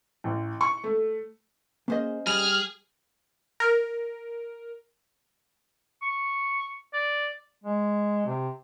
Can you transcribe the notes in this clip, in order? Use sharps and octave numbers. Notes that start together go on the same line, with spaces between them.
A1
C#6
A3
A#3 C#4 G#4 C5 D#5
G3 G#4 B5 F6
A#4
C#6
D5
G#3
C3